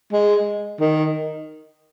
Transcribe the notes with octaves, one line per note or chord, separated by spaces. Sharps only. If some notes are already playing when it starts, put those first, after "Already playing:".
G#3
D#3